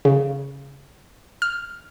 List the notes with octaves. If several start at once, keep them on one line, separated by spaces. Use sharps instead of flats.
C#3
F6